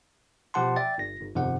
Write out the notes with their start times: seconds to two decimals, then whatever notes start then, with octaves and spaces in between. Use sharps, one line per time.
0.54 B2 F3 G4 F#5 A5 C6
0.76 D5 E5 G5 A6
0.98 G1 A#6
1.21 G1
1.35 G1 F2 C3 D#3 F3 F#5